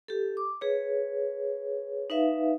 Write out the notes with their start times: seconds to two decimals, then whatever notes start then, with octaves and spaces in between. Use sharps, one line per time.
0.08 G4 A4
0.37 D6
0.61 G#4 B4 C#5
2.10 D#4 B4 E5 F5